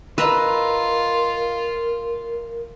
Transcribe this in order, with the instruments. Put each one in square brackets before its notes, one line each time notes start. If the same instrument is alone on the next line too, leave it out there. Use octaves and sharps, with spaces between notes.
[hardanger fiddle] F4 [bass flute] A#4 [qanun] B4 [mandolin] D#5 A#5 E6